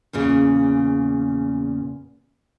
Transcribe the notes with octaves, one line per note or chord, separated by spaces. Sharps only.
E2 A#2 C#3